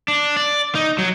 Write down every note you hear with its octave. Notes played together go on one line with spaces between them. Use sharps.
D4
D5
D#4
F#3